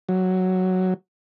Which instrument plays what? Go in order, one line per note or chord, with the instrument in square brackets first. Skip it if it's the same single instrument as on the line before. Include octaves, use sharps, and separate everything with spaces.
[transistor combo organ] F#3